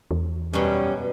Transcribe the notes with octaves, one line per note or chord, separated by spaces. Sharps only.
E2
F#2 B2 G3 C#4